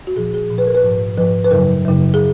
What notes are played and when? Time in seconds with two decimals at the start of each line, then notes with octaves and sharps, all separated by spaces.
0.07 F#4
0.16 A#2 F3 G#4
0.34 G#4
0.50 A#2 F3
0.58 B4
0.67 A#4
0.75 B4
0.83 G#2 F3
1.17 G#2 F3 B4
1.44 B4
1.51 F#2 C#3 F#3 A#4
1.85 F#2 C#3 F#3
2.14 G#4